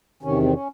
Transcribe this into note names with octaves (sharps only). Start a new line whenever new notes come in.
E2 C3 D#3 C#4
C4
C#4